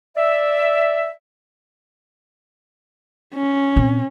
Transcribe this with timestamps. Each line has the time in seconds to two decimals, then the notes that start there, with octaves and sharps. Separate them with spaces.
0.16 D5 E5
3.35 C#4
3.76 A#2 C4